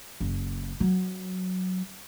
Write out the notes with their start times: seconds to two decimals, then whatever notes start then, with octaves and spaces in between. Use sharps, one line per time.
0.20 F#1
0.80 F#3